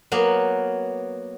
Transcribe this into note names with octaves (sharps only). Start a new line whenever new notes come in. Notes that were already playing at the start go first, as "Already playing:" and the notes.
F#3 A#3 B3